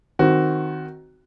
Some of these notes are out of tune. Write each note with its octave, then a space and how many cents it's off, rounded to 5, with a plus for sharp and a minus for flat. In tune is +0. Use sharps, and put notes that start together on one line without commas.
D#3 +0 C4 +0 F#4 +10